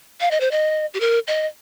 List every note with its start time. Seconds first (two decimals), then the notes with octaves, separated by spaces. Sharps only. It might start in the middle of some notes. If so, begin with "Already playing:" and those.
0.21 F5
0.31 D#5
0.40 C5
0.51 D#5
0.94 G4
1.00 A#4
1.27 D#5